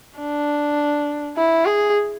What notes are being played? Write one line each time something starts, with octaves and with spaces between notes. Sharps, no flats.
D4
E4
G#4